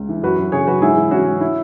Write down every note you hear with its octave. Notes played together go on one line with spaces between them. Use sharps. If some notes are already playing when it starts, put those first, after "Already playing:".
Already playing: C#2
E3
F#2 F#4 B4
F#2
C#3 G#4 C#5
F#3 F#4 B4
G#2 E4 G#4
E3
E3 C#4 F#4
G#2
E4